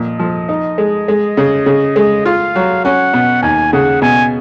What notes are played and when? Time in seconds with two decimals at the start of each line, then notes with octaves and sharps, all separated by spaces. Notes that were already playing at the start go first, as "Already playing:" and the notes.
Already playing: A#2 F3 D#5
0.19 F3
0.49 D#4
0.78 G#3
1.08 G#3
1.37 C#3
1.66 C#3
1.96 G#3
2.25 F4 F5
2.55 F#3
2.85 C#4 F#5
3.13 B2
3.43 D#2 G#5
3.73 C#3 F#5
4.02 B2 G#5